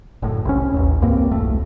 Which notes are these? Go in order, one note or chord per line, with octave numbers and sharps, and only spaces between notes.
F#1 A2
C2 C#4
A1 D#2
C#2 G2 A#3 C4
E1 C2 A3